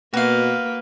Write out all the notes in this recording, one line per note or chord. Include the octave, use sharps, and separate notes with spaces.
B2 A#3 F#4 B4 F5